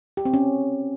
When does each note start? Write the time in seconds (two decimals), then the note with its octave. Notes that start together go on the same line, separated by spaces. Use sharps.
0.17 G4
0.25 C4
0.34 C#4